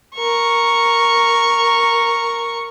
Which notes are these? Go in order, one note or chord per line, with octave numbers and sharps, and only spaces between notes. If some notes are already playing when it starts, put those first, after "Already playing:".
A#4 C#6